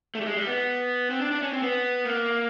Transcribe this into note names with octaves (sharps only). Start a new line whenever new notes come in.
A3
G3
G#3
G3
B3
C4
D4
D4
C#4
C4
B3
A#3